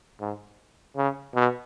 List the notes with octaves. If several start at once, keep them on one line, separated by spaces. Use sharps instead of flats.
G#2
C#3
B2